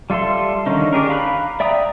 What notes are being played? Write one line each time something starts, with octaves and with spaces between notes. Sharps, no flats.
G3 F4 A4 E5 C6
D3 D#3 C#4 D#4
D4 G4 G#4 A#4
F5 A#5 B5 D6 F#6
D5 E5 G5 A#5 D#6